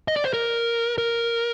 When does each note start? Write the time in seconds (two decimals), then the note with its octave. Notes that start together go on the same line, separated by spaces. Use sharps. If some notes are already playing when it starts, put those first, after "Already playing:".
0.08 D#5
0.16 D5
0.25 C5
0.33 A#4
0.98 A#4